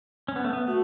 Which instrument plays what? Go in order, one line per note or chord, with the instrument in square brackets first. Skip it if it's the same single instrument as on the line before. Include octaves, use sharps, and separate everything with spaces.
[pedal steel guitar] C#4
B3
A3
B3
[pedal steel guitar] A3 [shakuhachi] F#4